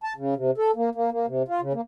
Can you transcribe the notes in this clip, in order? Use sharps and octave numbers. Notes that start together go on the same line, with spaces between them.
A5
C#3
C3
A4
A#3
A#3
A#3
C3
F4
C#3
A#3